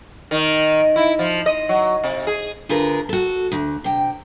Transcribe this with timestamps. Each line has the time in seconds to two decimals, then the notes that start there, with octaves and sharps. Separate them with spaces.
0.31 D#3
0.96 E4
1.19 F3
1.46 D#5
1.69 F#3
2.04 C3
2.27 G#4
2.69 D2 D3 F4 G#4 A#4 B4
3.09 F#4 A4
3.52 D2
3.84 C3 G5